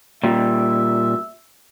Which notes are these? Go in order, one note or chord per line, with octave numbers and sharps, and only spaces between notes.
A#2 G3 E5